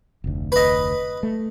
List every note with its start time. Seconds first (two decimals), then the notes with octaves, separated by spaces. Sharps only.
0.24 F1 D2
0.52 B4 D#5
1.23 A3